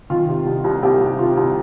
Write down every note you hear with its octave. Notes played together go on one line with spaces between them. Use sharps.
D#3 F4
C3
C2
C2
C2 G4
C2
C3 F4
C2